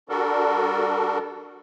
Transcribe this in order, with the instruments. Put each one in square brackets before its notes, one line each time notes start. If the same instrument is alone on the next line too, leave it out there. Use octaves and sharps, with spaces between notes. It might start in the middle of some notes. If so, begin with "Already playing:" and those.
[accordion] G3 D4 F#4 A4 A#4